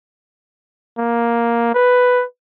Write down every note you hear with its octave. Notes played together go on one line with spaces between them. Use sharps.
A#3
B4